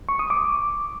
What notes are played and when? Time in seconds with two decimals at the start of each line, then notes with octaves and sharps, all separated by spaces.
0.09 C#6
0.19 D#6
0.30 D6